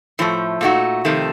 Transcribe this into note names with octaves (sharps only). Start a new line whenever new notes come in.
A2 F3 A3
A#2 A3 D#4 F#4
F2 C3 D#3 A3